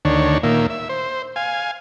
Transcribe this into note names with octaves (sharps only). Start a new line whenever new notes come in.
D2 D#3 D4 C#5
A#2 D#3 A#3 E5
E5
C5
F5 G#5